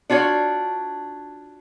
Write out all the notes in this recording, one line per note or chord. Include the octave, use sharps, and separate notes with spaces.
D4 F4 F#4 C#5